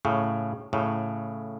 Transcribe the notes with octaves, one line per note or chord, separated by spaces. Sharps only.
A2 C#3
A2 C#3